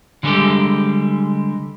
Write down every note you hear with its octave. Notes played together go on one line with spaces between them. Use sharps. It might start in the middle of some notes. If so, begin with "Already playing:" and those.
D3 G3 G#3 A#3 G4 A4